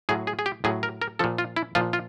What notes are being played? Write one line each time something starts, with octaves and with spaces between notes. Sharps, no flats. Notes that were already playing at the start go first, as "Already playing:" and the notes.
A2 F#3 G#4
G#4
G#4
G4
A2 F#3 G#4
A#4
A#4
A#2 F3 A4
F4
E4
A#2 F3 F4
F4